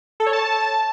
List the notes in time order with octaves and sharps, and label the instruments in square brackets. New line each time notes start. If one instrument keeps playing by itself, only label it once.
[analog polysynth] A4
C#5
A5